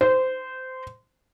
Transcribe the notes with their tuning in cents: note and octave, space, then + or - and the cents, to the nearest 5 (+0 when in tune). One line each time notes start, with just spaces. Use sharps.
C5 -20